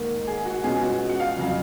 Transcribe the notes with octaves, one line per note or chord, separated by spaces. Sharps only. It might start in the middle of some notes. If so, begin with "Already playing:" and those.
Already playing: G#2 D#3 A#3
G#4
F#4
B2 G#3 C#4 F4 G#4
F#4
F#5
F5
F2 C#3 F#3 F5